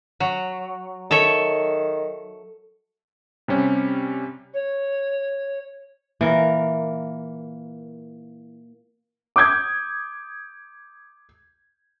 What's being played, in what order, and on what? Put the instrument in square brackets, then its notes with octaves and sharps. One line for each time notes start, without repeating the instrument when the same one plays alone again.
[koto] F#3
[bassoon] D#3 [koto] A4 C#5 E5
[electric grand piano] C3 G3 C#4
[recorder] C#5
[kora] E3 A#4 [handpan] A#3
[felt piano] D6 D#6 G6 G#6